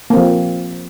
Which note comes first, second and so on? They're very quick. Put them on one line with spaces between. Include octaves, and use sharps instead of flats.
A#3 C4 F3